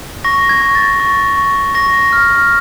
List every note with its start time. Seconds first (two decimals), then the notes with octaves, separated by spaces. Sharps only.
0.24 C#6 A#6
0.49 G#6
0.62 C#6
0.75 A6
1.00 C#6
1.37 C#6
1.74 C#6 A#6
2.13 F6